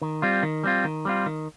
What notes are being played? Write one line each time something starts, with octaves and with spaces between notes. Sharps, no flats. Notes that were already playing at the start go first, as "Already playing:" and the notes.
D#3
G3 C4 F4
D#3
G3 C4 F4
D#3
G3 C4 F4
D#3